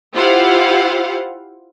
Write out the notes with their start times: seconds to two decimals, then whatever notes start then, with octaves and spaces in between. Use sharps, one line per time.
0.15 E4 F4 G4 C5 F5 F#5